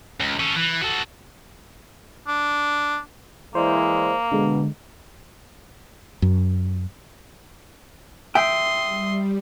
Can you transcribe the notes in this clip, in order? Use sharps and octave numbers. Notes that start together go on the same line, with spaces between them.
C#2
C#4 A4
E3
F#4 A4
D4
E3 G#3 A#3 E4 C5 D5
B2 D3 G#3
F#2
E5 G5 C6 D#6
G3